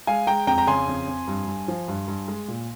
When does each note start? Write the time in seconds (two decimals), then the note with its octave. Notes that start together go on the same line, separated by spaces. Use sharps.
0.07 G#3 F5 G#5
0.27 G#3 G5 A#5
0.47 F2 G5 A#5
0.58 A#5
0.67 C#3 G#5 C6
0.88 F2
1.08 F2
1.28 G2
1.47 G2
1.68 F3
1.88 G2
2.08 G2
2.28 G#3
2.48 A#2